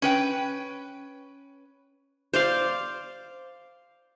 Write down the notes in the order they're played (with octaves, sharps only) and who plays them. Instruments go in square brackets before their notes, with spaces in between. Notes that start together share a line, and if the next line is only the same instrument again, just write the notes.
[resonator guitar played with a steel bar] C#4 B4 G5
[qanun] C5 D5 F5